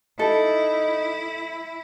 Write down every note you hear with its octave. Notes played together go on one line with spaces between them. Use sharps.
D#4 E4 A4